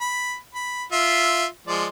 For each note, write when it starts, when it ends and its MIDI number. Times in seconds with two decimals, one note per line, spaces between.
0.01 0.36 83
0.55 0.84 83
0.92 1.46 65
0.92 1.46 76
1.67 1.86 53
1.67 1.86 56
1.67 1.86 74